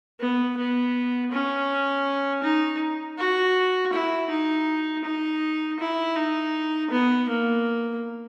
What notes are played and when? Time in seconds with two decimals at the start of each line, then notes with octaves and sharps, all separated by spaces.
0.20 B3
0.57 B3
1.32 C#4
2.43 D#4
3.18 F#4
3.93 E4
4.30 D#4
5.04 D#4
5.79 E4
6.16 D#4
6.91 B3
7.28 A#3